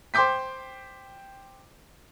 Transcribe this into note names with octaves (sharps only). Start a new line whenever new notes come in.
C5 G5 C6 D6 G6 B6